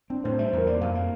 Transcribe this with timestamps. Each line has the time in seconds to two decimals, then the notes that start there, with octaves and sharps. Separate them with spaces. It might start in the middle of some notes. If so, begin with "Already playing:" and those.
0.10 C4 D4
0.24 A2 C5
0.39 G3 E5
0.47 C5
0.53 E2 A#4
0.67 A#3 D5
0.81 F2 F5
0.95 A#3